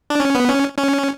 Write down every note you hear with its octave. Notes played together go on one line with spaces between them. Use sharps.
D4
C#4
B3
C#4
C#4